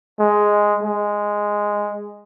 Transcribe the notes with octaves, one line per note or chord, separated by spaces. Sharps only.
G#3
G#3